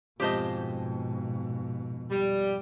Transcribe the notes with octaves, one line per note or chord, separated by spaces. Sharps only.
F2 G#2 B2 G#3 G4 C5 D#5 A5
G3